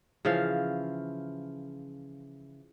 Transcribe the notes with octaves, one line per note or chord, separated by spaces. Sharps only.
C#3 E3 F3 F5